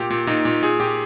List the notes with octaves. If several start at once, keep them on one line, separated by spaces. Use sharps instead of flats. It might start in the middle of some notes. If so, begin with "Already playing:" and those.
Already playing: A#2 G4
A#2
A#2 D#4
A#2
A#2 G#4
A#2 G4